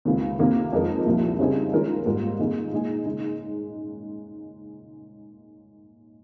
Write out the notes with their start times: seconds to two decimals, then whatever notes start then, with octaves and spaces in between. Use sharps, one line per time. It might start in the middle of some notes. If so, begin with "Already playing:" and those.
0.05 C#2 C3 D#3
0.39 C3 D#3 A#3
0.73 F2 D#3 G#3 D#4 A#4
1.06 C2 A#2 F3
1.39 C#3 G3 C4 D#4 G#4
1.73 D#3 G#3 C#4 F4 A#4
2.06 G#2 G3 A#3 F4
2.39 C3 D#3 A#3 D#4 G#4
2.72 A#2 G#3 D#4 G#4
3.05 C#3 G#3 D#4